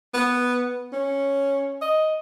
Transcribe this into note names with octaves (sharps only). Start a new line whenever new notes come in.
B3
C#4
D#5